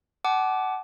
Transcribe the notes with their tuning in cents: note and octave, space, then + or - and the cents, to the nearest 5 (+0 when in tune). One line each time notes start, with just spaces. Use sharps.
F#5 +25 A5 -40 D6 +0